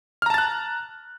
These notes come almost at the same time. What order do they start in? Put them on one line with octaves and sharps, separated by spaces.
F6 A#5 A5 A6 F#6